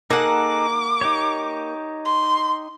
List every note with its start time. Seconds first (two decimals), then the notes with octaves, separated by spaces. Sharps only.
0.10 A#3 D#4 G#4 A4 F#5 D6
1.01 D#4 G4 C#5
2.05 C6